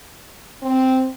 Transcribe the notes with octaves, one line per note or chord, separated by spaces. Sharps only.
C4